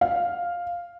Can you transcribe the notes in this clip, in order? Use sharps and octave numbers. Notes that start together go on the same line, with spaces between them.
F5